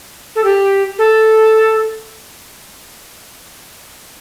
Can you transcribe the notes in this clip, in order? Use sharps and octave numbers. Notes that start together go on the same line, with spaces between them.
A4
G4
A4